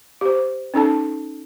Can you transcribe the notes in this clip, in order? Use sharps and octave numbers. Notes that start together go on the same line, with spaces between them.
G4 C5
C#4 D#4 A4 A5